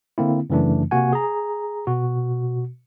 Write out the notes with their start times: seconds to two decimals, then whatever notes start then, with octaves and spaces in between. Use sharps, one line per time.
0.18 D3 A#3 C4 E4
0.50 F#2 C#3 E3 A3 D4
0.91 C3 A#3 F#4 F#5 G#5
1.13 G#4 A#5
1.87 B2 F#4